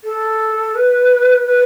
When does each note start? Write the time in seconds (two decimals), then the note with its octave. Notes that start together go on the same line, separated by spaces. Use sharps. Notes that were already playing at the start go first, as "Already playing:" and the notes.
0.04 A4
0.75 B4
1.46 B4